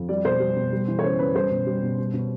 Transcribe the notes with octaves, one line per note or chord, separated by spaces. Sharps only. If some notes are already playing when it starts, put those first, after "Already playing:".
Already playing: F2
G3 D5
B2 C5
G3
B2
G3
E3
C#5
C#3 C5
F#2 B4
G3 C5
B2
G3
B2
G3
B2